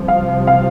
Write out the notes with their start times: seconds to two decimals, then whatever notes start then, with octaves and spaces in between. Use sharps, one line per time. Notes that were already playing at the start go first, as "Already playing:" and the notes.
Already playing: C2 C3 F3
0.08 F5
0.47 F5